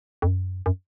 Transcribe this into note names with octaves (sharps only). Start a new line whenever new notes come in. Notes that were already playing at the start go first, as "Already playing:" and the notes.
F2
F#2
F#2